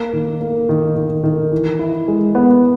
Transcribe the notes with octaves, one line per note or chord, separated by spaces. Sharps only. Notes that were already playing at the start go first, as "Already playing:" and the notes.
Already playing: A#3
D#3
A#3
D#3
D#3
D#3
E3
E4
G#3
B3